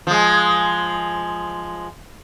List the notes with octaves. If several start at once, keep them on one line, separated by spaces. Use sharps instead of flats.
F3 G#3